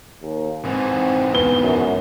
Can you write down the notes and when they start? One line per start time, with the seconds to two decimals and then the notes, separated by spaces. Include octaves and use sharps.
0.21 D#2
0.65 G#2 E3 C4
1.34 B3 G7
1.62 F#2